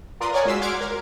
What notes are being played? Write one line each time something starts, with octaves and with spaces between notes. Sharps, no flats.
F4 A#4 B4 D5 C6 D#6
A#4 C#5 D5 F#5 G#5
G#3 F4 F#4 C6 E6 B6
F#5 C6 D6 F6 G#6 D7
A#4